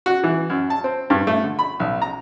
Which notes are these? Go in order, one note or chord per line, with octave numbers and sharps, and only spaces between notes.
F#4
E3
F#2
A5
C4
G2
A3
D3
B5
B1
A#5